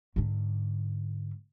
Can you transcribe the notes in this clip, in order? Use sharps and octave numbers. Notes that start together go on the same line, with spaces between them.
G#2 D3